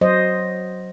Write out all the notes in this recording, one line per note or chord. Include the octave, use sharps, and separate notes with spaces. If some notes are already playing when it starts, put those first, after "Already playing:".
F#3 C5 D#5